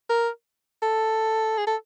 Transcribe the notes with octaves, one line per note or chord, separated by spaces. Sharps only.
A#4
A4
G#4
A4